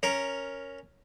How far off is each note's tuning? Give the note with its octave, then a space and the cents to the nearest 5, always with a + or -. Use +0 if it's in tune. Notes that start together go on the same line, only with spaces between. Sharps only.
C#4 +0 A#4 +0